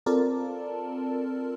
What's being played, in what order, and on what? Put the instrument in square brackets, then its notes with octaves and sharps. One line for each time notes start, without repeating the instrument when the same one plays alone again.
[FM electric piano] C4 F4 A4 A#4 D5 A5